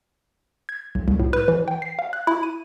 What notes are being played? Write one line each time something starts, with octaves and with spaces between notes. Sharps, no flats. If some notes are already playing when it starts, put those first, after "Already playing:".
G#6
B1
C2
A2
B4
E3
G5
C7
F5
F#6
E4
D#7